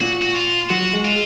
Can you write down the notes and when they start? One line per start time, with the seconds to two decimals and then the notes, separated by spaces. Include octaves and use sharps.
0.01 A#2 F#4
0.22 F#4
0.36 F4
0.70 F#3 F#4
0.93 G#3
1.05 F4